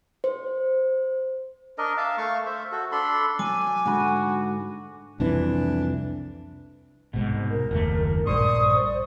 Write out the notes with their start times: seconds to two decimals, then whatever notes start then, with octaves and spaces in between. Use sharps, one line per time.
0.24 C5
1.78 D4 A#4 D#5
1.97 E5 F5 A5
2.18 A3 F5 C#6
2.46 C5 E5
2.72 F#4 A4
2.92 D4 A4 B5 C6
3.39 F#3 G#5 D6
3.86 G#2 D3 F#4 B5
5.20 C2 F2 E3 D4
7.14 C2 G#2 B2
7.50 A#4 A#5
7.71 F#1 D#2 A3
8.26 A#1 G2 C5 D5 C6 C#6 D#6